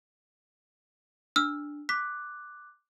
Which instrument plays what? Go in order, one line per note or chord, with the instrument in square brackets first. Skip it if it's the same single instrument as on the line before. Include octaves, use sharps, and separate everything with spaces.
[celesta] D4 [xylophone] E6 F6
[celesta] D6 F#6 [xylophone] B6